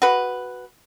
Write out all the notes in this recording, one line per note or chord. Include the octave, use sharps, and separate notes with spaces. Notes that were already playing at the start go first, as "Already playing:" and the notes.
F#4 G#4 B4